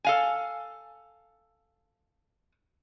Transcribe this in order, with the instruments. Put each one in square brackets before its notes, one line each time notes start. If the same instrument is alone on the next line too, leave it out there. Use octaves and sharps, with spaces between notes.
[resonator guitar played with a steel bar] A4 F5 G#5